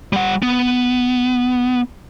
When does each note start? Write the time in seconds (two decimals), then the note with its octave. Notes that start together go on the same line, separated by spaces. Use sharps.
0.13 G3 F#5
0.42 B3